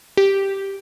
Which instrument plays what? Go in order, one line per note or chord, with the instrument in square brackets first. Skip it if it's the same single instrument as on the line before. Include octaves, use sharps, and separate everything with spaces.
[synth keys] G4